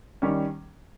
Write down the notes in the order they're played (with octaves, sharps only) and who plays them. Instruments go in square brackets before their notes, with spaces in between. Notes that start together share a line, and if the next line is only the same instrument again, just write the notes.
[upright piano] D#3 G3 C#4